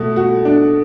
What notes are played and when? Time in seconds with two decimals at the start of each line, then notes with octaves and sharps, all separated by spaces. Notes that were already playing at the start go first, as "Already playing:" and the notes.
Already playing: B2 A3
0.16 F#4
0.45 D4